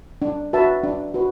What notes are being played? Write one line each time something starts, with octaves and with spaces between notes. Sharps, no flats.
D4
F#4 B4 E5 A5
D4
F#4 B4